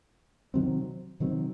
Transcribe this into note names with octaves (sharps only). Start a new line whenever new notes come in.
C3 D#3 F#3 C4
C3 D#3 F#3 C4